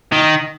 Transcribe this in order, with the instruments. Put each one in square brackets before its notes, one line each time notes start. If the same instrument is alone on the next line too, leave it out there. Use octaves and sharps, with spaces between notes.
[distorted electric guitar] D#3